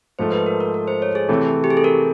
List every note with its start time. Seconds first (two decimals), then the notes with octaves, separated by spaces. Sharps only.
0.19 G#2 F3 A3 C5
0.32 B4
0.46 A#4
0.61 A#4
0.74 A#4
0.88 C5
1.02 C#5
1.15 G#4
1.29 C3 E3 A3
1.64 G4
1.70 G#4
1.77 A4
1.84 A#4